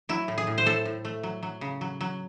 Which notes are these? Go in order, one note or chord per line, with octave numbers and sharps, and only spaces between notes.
F#3 E4
A2
G#4
A2
C5
A2 A4
A2
A3
F#3
F#3
C#3
F#3
F#3